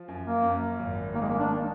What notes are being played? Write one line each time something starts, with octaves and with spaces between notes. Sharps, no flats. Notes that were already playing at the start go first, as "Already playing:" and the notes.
Already playing: F3
F#2
A#3
F#2
G#1
D#3 A#3
G#3
A#3
D4